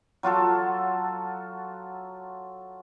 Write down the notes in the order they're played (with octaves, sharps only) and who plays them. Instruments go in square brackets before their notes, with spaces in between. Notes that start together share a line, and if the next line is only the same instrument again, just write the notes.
[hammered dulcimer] F#3 F4 F#4 A4